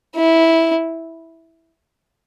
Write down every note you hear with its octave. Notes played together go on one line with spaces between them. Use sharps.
E4